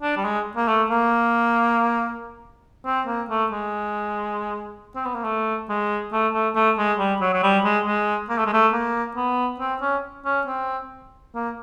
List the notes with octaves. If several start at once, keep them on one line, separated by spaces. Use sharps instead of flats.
D4
G3
G#3
A#3
A3
A#3
C4
A#3
A3
G#3
C4
B3
A#3
A3
G#3
A3
A3
A3
G#3
G3
F#3
F#3
G3
G#3
G#3
A#3
A3
G#3
A3
A#3
B3
C4
C#4
C#4
C4
A#3